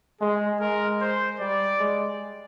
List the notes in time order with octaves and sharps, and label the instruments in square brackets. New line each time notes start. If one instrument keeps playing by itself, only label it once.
[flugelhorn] G#3 [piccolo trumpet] G#4
[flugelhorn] G#3 [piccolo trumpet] A#4
[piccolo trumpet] C5
[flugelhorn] G3 [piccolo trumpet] D5
[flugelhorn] G#3